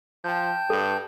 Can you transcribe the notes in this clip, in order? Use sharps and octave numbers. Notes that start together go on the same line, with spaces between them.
F3 G5 A5 G6
G2 A4